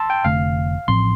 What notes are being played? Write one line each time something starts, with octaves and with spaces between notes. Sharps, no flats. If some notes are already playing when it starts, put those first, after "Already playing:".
Already playing: A5 C6 E6
G5
F1 F2 D3 A3 F5
A1 A2 F3 C4 C6